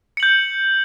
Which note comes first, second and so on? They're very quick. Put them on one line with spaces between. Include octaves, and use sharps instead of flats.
C#7 F#7 G6